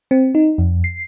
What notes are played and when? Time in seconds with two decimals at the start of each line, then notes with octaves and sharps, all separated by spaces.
0.11 C4
0.35 D#4
0.58 F2
0.84 C7